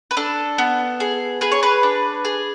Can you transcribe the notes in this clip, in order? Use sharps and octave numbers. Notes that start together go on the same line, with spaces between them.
B4
D4 A4
B3
G#4
G#4 B4
C#5
B4
D4
G#4